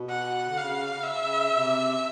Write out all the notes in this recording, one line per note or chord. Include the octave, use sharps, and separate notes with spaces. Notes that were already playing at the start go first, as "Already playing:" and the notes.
Already playing: B2
F#5
D3
C#3 F5
E5
C#3
C3